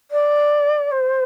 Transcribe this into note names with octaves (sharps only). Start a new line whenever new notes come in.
D5
C5